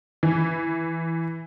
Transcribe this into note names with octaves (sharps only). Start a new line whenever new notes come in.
E3